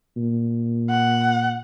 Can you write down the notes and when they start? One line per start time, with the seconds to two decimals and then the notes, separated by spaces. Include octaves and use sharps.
0.16 A#2
0.90 F#5